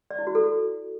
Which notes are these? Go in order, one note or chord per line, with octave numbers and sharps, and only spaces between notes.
D5
E4
F#4
A4